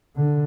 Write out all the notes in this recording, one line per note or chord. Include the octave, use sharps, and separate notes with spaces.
D3